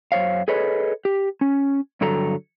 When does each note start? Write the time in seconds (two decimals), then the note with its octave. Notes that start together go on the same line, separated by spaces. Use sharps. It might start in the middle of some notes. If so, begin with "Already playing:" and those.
0.12 F#2 C5 C#5 F5
0.48 G#4 A4 B4 C#5 D#5
1.05 G4
1.41 C#4
2.01 G2 D3 F#3 A4 A#5